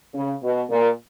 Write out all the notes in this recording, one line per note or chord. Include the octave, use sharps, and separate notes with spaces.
C#3
B2
A#2